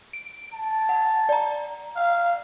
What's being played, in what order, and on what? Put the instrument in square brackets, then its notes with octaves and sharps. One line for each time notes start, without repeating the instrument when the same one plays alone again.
[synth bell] D7
[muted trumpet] A5
[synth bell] F#5
D5 A#5
[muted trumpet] F5